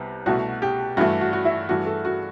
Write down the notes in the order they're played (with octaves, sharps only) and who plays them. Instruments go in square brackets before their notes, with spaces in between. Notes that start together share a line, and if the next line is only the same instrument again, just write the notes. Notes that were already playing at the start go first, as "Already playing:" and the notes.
Already playing: [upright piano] C2 C3 G3 B3
C2 B2 A3 F#4
G4
G2 E3 A3 F#4
F#4
F#4
E4
G2 E3 A3 F#4
A4
F#4